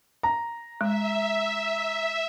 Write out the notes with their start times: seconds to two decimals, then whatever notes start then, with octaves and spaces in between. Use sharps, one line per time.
0.23 A#5
0.81 G#3 E5